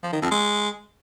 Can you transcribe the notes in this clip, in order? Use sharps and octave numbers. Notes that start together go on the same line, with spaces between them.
F3
D#3
F2
G#3